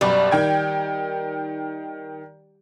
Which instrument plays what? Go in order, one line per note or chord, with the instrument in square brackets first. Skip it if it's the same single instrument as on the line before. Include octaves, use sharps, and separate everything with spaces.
[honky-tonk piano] F#2 B2 D5 [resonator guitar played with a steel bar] G3
[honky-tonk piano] D#3 G5 G#6